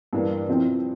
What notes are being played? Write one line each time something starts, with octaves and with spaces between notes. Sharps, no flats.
G2 E3 A#3 D4
C3 F3 C4 E4